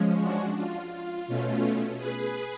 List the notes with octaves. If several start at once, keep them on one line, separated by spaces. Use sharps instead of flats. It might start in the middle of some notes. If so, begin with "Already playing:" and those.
Already playing: F3 G#3 C#4
D4 F#4
F4
F4
B2 A3 C#4
G#4 B4